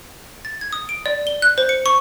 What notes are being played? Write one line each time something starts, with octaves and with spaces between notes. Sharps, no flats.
A6
G#6
D#6
D7
D5
G7
F#6
C5
C#7
C#6